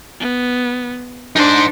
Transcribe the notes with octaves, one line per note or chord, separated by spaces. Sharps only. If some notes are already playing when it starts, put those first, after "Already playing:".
B3
D4 D#4 C5